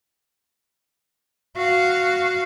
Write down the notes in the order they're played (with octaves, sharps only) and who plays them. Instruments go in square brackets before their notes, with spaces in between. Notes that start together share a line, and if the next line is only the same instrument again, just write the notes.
[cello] F#4 F5